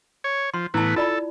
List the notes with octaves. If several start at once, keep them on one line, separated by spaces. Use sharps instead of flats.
C#5
F3 C6
A2 E3 B3 E4 A5
F4 A4 D5 B5